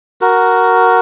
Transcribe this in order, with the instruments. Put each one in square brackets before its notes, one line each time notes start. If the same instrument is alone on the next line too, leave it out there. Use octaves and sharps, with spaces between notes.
[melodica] F#4 A#4